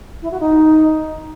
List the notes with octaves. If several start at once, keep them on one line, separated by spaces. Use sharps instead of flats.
E4
F#4
D#4